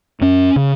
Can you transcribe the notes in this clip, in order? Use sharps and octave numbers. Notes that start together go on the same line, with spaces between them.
F#2 C#4
C#3